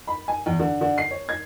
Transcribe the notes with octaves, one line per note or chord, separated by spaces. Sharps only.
B5
G#5
E2
D3
D3
C7
C#5
G#6